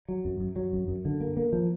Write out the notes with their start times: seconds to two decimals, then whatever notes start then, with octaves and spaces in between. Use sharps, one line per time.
0.08 F#3
0.25 F#2
0.40 F#2
0.56 F#3
0.73 F#2
0.88 F#2
1.05 D3
1.21 A#3
1.37 A#3
1.53 F3